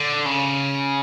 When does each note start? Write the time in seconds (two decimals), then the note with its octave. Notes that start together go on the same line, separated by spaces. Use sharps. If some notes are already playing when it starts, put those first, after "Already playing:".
Already playing: D3
0.26 C#3